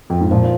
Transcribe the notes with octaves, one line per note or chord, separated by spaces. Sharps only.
F2
G#2
A#2 F3